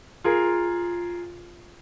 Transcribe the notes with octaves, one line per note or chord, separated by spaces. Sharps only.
F4 G#4 A#4